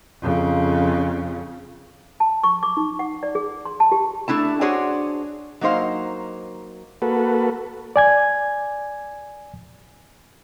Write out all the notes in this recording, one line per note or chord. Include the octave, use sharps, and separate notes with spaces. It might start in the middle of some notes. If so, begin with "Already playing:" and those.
F2 C#3
A5
C#6
D6
D#4
F#5
D5
G#4
C6
A5
G4
A3 D4 E4 A5
D4 F#4 G#4 C5 C#5
F#3 A#3 D#4 C5 F5
A#3 F#4 A4 B4
D5 G#5 G#6